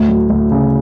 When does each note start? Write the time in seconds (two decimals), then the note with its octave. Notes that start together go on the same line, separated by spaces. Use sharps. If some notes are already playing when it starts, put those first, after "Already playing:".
Already playing: D2 A2
0.08 F#3
0.30 D2
0.52 C#3